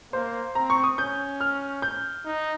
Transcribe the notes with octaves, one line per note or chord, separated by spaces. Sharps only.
A#3 C5
C4 A#5
C#6
D#6
C#4 G6
F6
G6
D#4